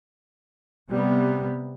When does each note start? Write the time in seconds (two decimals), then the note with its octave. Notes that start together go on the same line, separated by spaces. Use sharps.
0.90 C3 G3 B3